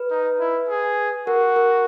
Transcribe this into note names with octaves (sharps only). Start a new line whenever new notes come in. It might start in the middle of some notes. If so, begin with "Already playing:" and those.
Already playing: B4
D#4
E4
G#4
F#4 A#4
A#4